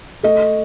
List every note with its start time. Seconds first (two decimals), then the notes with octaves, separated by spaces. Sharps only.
0.23 A3 D#5